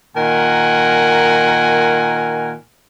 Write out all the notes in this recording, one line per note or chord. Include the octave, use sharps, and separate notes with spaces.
A#2 D#3 A#4 F#5 G#5